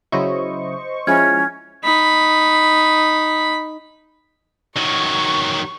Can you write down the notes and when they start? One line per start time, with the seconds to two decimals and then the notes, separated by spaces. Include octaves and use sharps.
0.12 C#3 F#3 E4 C5 D#5 C#6
1.07 F3 G#3 C#4 E4 F6 G#6
1.84 D#4 B5
4.77 D#3 F#3 C#6